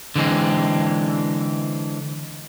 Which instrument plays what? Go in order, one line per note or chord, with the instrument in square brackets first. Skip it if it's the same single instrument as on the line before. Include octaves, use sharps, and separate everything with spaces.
[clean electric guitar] D3 E3 G#3 C4